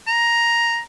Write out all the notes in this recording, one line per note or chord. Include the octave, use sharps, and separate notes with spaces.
A#5